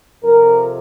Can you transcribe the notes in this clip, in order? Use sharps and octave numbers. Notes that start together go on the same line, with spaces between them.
F2 C3 F3 A#4